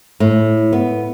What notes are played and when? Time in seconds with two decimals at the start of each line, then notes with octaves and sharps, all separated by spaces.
0.20 A2
0.72 B3